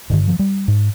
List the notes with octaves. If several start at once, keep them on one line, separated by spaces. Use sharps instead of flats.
G2 D3 D#3
F3
G3
G#2